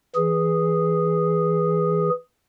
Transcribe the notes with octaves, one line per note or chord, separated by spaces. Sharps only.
E3 G#4